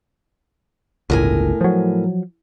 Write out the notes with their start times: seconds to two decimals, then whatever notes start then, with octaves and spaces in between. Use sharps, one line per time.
1.10 G1 C#2 A2 A#4 G#5
1.61 F3 F#3